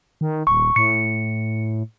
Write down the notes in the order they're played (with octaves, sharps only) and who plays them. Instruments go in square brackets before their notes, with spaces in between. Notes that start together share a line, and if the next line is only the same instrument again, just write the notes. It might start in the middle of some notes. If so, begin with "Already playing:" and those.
[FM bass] D#3
[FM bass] D#1 [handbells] C#6
[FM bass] A2 [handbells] C#7